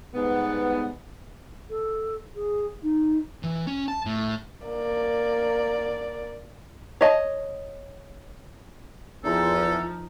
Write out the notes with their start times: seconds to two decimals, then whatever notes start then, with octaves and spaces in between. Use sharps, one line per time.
0.14 G#2 G3 B3
1.70 A4
2.35 G#4
2.83 D#4
3.43 E3
3.67 C#4
3.88 A5
4.05 A2
4.67 A#3 D5
7.01 C#5 D#5 A5
9.24 E2 F3 D#4 A4